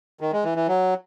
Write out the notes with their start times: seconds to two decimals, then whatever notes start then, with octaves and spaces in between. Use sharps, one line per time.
0.21 D#3
0.32 G#3
0.44 E3
0.56 E3
0.68 F#3